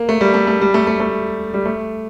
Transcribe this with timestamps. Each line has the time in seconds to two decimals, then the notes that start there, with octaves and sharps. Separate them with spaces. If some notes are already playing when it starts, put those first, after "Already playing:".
Already playing: A#3
0.09 A3
0.21 G3
0.34 A3
0.47 A3
0.61 G3
0.74 A3
0.87 A3
1.00 A3
1.54 G3
1.66 A3